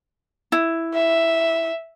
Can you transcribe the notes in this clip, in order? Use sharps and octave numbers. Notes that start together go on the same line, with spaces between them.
E4
E5